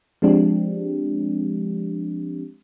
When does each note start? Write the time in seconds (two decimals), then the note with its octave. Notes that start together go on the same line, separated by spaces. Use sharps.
0.22 F3 G#3 C4 D4 G4